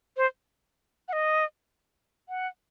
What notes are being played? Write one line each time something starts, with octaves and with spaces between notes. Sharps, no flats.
C5
F#5
D#5
F#5